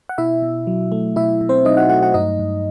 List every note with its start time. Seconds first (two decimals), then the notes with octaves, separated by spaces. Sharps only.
0.09 F#5
0.18 B2 E4 E5
0.42 B2
0.67 F#3
0.92 A3
1.16 B2 E4 E5
1.41 B2
1.49 C4 C5
1.65 F#3 D#4 D#5
1.77 F#4 F#5
1.89 A3 F#4 F#5
2.03 F#4 F#5
2.14 G2 D#4 D#5
2.39 G2